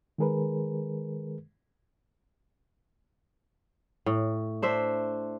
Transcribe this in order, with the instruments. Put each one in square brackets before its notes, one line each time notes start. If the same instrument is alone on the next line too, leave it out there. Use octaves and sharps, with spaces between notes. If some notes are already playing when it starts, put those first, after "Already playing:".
[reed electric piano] D#3 G#3 G#4 A#4 B4
[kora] A2
D4 C5 E5